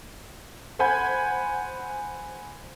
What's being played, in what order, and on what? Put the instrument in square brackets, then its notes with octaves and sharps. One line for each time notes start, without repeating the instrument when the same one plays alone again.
[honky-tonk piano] C5 F#5 G#5 B5 G6 G#6